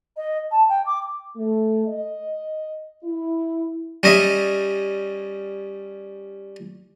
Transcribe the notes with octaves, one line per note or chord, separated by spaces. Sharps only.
D#5
A5
G5
D6
A3
D#5
E4
G3 C#4 D#5 E5